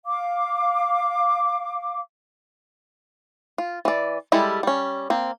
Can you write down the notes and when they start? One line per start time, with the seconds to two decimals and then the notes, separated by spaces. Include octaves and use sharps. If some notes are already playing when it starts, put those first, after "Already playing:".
0.05 F5 D6
3.58 F4
3.85 E3 D5
4.32 G3 G#3 E4 G4 A4
4.63 G3 C#4
5.10 A#3 C4